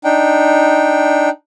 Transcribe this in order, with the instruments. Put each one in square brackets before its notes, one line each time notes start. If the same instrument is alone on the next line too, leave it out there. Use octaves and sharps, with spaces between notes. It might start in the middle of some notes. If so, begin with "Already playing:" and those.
[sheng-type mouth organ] D4 D#4 G5